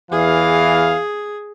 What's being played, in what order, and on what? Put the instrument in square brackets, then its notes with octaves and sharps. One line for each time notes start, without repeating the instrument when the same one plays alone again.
[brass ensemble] E2 E3 F5 [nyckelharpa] G#4